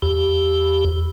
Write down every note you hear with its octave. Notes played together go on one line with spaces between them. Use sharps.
E2 G4